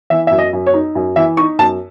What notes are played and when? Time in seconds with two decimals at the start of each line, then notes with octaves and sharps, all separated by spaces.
0.10 E3 E5
0.27 F#2 E5
0.38 D#5
0.53 F#2
0.67 C#5
0.74 D#4
0.95 F#2
1.16 E3 E5
1.37 D#4 C#6
1.59 F#2 A5